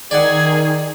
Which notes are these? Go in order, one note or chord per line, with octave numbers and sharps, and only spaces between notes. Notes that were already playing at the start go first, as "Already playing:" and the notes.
D#3 G#4 D5 F#5 G#6